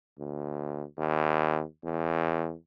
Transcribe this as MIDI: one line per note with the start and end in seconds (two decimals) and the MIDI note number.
0.19 0.84 38
0.98 1.64 39
1.84 2.54 40